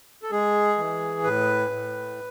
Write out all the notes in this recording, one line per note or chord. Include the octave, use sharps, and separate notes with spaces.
A4
G#3 G#4
E3
A2 B4
A2